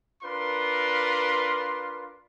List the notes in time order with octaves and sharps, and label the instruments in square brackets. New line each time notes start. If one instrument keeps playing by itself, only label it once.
[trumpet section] D4 F4 A#4 B4 C6